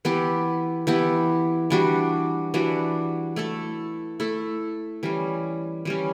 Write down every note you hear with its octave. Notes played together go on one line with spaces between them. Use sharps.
E3 B3 E4 G4
E3 B3 E4 G4
E3 G3 D4 F#4
E3 G3 D4 F#4
A3 E4 A4
A3 E4 A4
E3 G3 C#4
E3 G3 C#4